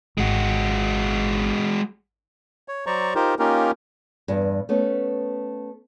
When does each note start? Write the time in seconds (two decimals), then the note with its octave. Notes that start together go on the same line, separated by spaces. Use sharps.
0.18 G#1 G#3 F#4
2.68 C#5
2.86 F#3 C5 D5 A#5 C#6
3.15 D#4 F4 G4 A#4 C5
3.39 A#3 C#4 D#4 F4 G4 A#4
4.28 E2 G2
4.69 A3 B3 C#4